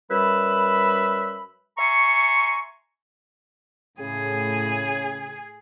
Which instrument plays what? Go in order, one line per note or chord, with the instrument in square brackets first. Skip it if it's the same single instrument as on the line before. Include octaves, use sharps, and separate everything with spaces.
[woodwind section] F#2 G3 B4 E5 B5
E5 G#5 A#5 C6 C#6
[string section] A2 [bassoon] C#3 [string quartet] G#4